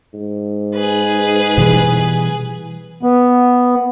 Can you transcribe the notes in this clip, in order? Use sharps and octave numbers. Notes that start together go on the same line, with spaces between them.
G#2
G#4 B4
B2 E3 G3
B3